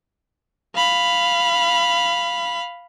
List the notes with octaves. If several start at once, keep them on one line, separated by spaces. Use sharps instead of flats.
F5 B5